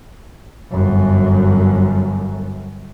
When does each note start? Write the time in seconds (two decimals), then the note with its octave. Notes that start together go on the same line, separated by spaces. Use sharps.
0.71 G1 F#2